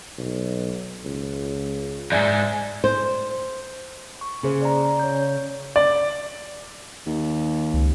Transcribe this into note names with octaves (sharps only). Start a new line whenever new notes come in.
B1
C#2
E2 G#2 D5 E5 G#5
C5
C#6
C#3 A#3 G#4 C5
D5 A#5
C#5 G6
D5
D#2
C#2